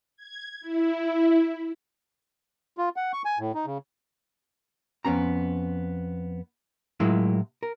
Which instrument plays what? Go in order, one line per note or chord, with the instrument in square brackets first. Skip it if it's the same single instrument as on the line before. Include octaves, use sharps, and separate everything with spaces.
[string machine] G#6
E4
[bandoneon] F4
F#5
C#6
G#5
A2
D#4
C#3
[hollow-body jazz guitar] F2 B3 C#4 A#5
A2 F#3 G#3 A#3 E4 F4
A#4